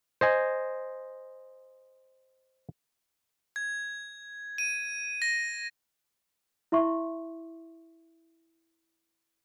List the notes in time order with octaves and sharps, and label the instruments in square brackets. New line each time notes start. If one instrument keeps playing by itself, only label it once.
[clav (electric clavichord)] C5 D#5 G#5
[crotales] G#6
D#7
A#6
[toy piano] E4 E5 C6 C#6